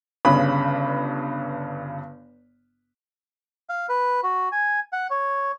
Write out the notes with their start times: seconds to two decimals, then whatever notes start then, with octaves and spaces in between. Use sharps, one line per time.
0.25 G1 G2 C#3 B5
3.69 F5
3.89 B4
4.23 F#4
4.52 G#5
4.93 F#5
5.10 C#5